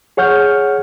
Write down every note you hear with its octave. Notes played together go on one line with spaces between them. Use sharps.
G#4 C#5 F#5 F6 G6